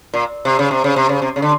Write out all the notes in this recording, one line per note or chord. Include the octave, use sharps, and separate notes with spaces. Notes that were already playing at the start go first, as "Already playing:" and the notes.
A#2
C3
C#3
C3
C#3
C3
C#3
C3
C#3
D3